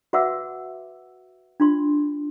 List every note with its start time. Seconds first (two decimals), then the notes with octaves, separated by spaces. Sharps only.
0.13 F#4 B4 E5 F#5 D6 E6
1.60 D4 F4 C6